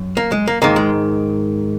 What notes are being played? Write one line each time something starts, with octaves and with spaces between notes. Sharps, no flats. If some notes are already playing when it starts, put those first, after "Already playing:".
Already playing: F#2
A#3
G#3
A#3
G#2 D#3 A#3
G#3